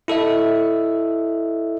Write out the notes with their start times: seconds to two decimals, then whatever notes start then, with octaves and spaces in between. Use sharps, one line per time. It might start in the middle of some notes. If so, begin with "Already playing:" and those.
0.08 E4 A4 D#5 E5